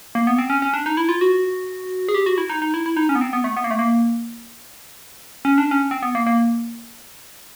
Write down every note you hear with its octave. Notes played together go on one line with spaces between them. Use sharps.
A#3
B3
C4
C#4
C#4
D4
D#4
E4
F4
F#4
G#4
G4
F#4
E4
D#4
D#4
E4
E4
D#4
C#4
B3
C4
B3
A3
B3
A#3
A3
A#3
C#4
D4
C#4
C4
B3
A#3
A#3